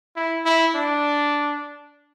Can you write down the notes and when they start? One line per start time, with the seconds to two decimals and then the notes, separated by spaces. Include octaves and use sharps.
0.16 E4
0.45 E4
0.75 D4